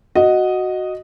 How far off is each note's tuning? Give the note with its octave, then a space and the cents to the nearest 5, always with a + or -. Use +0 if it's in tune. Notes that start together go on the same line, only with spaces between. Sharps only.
F#4 +0 D#5 +0